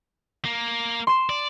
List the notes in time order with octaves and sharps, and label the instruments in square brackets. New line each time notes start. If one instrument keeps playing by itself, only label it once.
[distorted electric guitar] A#3
[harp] C6 E7
[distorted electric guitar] D5